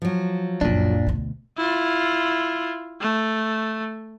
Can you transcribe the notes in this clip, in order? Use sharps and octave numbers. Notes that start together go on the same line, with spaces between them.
F3 F#3
F#1 C#2 A#2 D4
D2 B2
E4 F4
A3